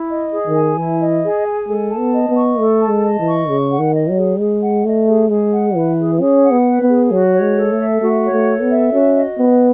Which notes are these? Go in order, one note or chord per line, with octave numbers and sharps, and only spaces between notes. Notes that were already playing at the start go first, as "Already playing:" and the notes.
Already playing: E4
D#5
G#4
D#3
G#5
E3 E4
D#5
G#4
G#5
G#3 A4
A5
B3
D#5
B3
C#6
A3 A4
A5
G#3
D#5
E3
C#6
C#3 G#4
F#5
D#3
D#5
F#3
G#4
G#3 G#4
F#5
A3 D#5
G#4
G#3 G#4
F#5
E3 B4
G#4
C#4 G#4
F#5
B3
B4
B3
G#4
F#3 F#4
C#5
G#3
A4
A3
E5
A3 F#4
C#5
A3
A4
B3
E5
C#4 F#4
D#5
B3 B4